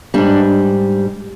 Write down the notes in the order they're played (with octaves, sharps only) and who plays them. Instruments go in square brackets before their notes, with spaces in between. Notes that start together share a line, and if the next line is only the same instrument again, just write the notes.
[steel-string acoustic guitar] G#2 G3 D4